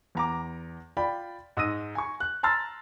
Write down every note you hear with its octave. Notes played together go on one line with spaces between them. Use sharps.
E2 A#5 D6
F4 D5 G5 B5
G#2 D#6 E6 A#6 D#7
G#5 C#6
F#6
A5 A#5 C6 E6 F6 A6